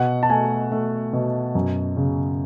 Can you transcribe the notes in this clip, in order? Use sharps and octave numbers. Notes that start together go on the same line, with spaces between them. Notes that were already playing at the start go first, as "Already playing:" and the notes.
Already playing: B2 F#5
A5
A3 G#5
A3
B2
F#2
C#3